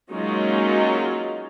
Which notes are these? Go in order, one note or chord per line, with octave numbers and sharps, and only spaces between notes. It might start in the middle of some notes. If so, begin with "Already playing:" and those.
F#3 G#3 A#3 C#4 D#4 F4